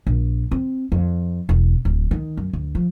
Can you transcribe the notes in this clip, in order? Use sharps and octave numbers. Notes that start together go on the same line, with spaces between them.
A#1
C4
F2
E1
D1
D#3
F#2
D2
F3